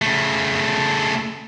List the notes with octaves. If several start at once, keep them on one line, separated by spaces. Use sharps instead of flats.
C#3 A3